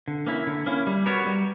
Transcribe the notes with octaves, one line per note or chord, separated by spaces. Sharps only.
D3
A#3 C#4 E4
D3
A#3 C#4 E4
G3
B3 F#4 A#4 C#5
G3